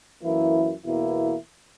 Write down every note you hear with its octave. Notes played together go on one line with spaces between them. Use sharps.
F#2 E3 A#3 E4
E2 B2 A#3 E4